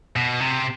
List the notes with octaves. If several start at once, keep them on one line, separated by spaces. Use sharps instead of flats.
B2
C3